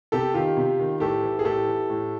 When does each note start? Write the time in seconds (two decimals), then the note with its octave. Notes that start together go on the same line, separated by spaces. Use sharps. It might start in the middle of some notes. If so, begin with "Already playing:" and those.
0.12 C3 G4 A4
0.34 D#3 F4 G4
0.57 C3
0.79 D#3
1.00 A2 G4 A4
1.23 E3
1.39 G#4
1.44 A2 G4 A4
1.67 E3
1.90 A2